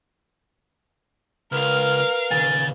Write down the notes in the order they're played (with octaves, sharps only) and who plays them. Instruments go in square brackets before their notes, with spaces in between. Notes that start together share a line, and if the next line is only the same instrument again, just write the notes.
[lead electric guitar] C#2 [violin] A#4 F5 [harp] B4 [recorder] F6
[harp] D#1 [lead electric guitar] C#3 G#5 [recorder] A6